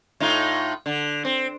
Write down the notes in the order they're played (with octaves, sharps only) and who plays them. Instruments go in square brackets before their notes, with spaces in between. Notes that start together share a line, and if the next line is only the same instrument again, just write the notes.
[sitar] A2 D#4 F4
D3
C4